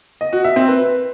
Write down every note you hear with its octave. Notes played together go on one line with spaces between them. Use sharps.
D#5
F#4
E5
C4
B4